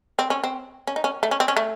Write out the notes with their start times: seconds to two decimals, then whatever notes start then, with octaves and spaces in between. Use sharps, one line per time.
0.19 C4
0.30 C#4
0.44 C4
0.87 C#4
0.96 D#4
1.04 C#4
1.23 A3
1.31 C#4
1.40 C4
1.48 C#4
1.57 A3